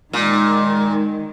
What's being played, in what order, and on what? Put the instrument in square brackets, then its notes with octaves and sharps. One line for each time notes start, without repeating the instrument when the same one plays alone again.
[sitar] A#2 [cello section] D#3 G#3